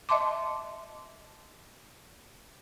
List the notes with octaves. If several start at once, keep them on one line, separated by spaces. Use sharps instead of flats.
D#5 E5 A5 C6 D6